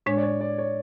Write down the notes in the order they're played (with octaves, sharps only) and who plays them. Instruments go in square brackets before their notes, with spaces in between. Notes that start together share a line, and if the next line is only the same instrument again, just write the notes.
[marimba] A2 G#3 D4 [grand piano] C#5
[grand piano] D5
C#5
D5
C#5